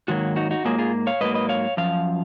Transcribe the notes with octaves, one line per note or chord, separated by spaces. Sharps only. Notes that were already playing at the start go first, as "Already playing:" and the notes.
G#2 D#3 F#3 A#3 F#4
D#4 F#4
D#4 F#4
G#2 F#3 A#3 F4 G#4
F4 G#4
C#5 F5
G#2 F#3 A#3 B4 D#5
B4 D#5
C#5 F5
F#2 F3 F5